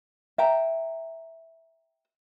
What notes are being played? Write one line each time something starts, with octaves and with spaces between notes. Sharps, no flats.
E5 G5 A#5